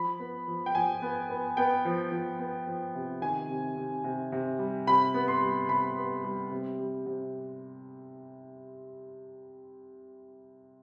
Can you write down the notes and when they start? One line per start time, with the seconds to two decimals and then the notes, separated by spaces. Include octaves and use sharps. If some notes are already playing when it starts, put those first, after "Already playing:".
Already playing: F3 B5
0.20 B3
0.48 F3
0.66 G5
0.75 F3 G#5
1.02 B3
1.30 B3
1.57 B3 G5
1.85 F3
2.12 F3
2.39 B3
2.67 F3
2.95 C3
3.22 D#3 G#5
3.49 C3
3.77 C3
4.04 C3
4.32 C3
4.59 G3
4.87 C3 B5
5.14 B3
5.28 C6
5.41 G3
5.69 C3 B5
5.97 B3
6.24 G3
6.52 C3
6.79 G3
7.06 C3